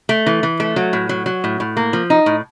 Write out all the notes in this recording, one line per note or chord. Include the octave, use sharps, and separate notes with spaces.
A3
E3
E3
A3
F#3
A2
F#3
F#3
A2
A2
A#3
F3
D#4
A2